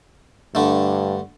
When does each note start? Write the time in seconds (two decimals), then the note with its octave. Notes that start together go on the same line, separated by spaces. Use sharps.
0.55 G2 D3 A3